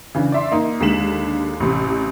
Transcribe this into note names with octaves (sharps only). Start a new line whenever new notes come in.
C#3 E3 D4
D5 E5 C6
A#3 D#4
D#2 D3 G#3 B6 E7 F#7
A1 C3